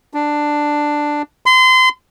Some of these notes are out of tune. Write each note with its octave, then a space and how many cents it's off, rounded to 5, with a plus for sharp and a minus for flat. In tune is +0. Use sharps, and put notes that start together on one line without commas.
D4 +5
C6 -30